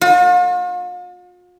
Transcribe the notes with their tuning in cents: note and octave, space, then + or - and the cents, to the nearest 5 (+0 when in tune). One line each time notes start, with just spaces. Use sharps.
F4 +45